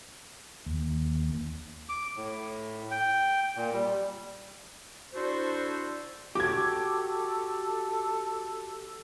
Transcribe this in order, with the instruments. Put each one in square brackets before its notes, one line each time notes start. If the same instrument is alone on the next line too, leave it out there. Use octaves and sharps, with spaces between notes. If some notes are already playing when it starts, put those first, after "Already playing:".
[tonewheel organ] D#2
[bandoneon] D6
A2
G5
A#2
G3
[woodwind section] D4 E4 F#4 A4 C5
[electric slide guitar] F#4 G4 [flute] A4 [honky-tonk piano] D6 G#6